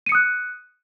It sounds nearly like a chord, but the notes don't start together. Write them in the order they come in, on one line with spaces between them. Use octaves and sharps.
D#7 C#7 D#6 F#6